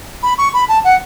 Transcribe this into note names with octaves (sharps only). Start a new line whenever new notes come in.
B5
C#6
B5
A5
F#5